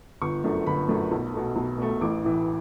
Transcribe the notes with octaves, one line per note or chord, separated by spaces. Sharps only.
G1 C#6
F#2 D3 A3
G1 B5
F#2 D3 A3
B1
B2 A3
B1
B2 A3
A1 D6
A2 E3